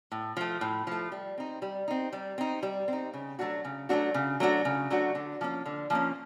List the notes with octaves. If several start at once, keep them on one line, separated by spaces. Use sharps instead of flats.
A2
F3 A3
A2
F3 A3
G3
C4 D#4
G3
C4 D#4
G3
C4 D#4
G3
C4 D#4
C#3
F#3 A3 D4 F#4
C#3
F#3 A3 D4 F#4
C#3
F#3 A3 D4 F#4
C#3
F#3 A3 D4 F#4
D3
F3 A#3 C#4
D3
F3 A#3 C#4